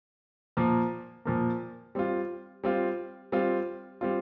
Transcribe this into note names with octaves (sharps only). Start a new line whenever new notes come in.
A#2 F3 A#3
A#2 F3 A#3
G3 C4 F4
G3 C4 F4
G3 C4 F4
G3 C4 F4